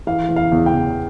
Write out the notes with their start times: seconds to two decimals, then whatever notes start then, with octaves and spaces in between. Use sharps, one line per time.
0.07 E3 F5
0.29 E3
0.36 F5
0.52 E2
0.66 G5
0.74 E2